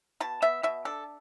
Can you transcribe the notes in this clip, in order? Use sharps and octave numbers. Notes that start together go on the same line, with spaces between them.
B2 A5
B3 E5
B2 E5
D4 A4